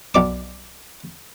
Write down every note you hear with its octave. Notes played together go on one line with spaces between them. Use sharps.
B1 D5 D6